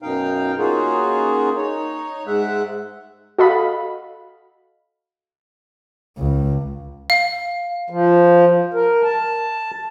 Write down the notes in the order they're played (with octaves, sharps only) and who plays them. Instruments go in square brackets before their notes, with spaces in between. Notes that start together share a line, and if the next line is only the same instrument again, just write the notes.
[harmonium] F#2 B2 D#4 F5 G5
A#3 C#4 D#4 F4 F#4 G#4
D#4 C#5
G#2 G#3 E5 F#5
[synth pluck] F#4 A4 D#5 F5 B5
[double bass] C#2
[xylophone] F5
[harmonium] F3
A#4
A5